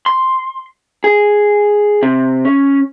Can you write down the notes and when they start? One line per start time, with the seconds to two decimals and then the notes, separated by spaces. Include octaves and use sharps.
0.06 C6
1.04 G#4
2.03 C3
2.45 C#4